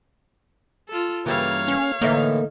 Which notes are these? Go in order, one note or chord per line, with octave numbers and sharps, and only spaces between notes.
F4 A4
G2 C#3 E3 A#3 G4 A4 C#5 F5
C#4
A2 D3 E3 A#3 D#4 A4 E5